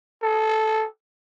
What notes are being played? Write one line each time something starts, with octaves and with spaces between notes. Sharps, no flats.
A4